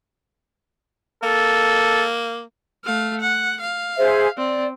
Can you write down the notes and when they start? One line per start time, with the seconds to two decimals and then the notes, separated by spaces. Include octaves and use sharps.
1.23 A#3 A4
2.85 A3 F5
3.20 F#5
3.60 F5
3.98 G#4 C5 E5
4.37 C4 D5